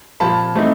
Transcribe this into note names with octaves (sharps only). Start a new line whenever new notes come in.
A#2 F3 A#3 A5 B5
E3 A3 C4 D#4